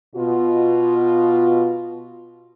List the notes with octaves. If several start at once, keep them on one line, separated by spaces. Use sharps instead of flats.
B2 F4